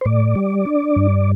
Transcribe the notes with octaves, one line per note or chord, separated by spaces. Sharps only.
C5
A2 D5
G3
D4
G2